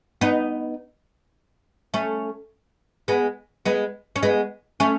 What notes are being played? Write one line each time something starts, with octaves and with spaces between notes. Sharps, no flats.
B3 D#4
A3 C#4
G#3 B3
G#3 B3
C#4
G#3 B3
A3 C#4